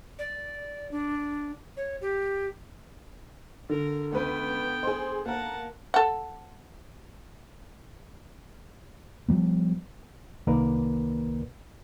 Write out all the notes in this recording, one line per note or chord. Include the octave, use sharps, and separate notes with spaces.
D5
D4
C#5
G4
D3 A#4
C#2 B3 B4 G5
G#4 C5
A#3 A#4 F#5 A5
A4 F#5
F3 G3 B3
C2 D#3 A#3 A#4 B4 D5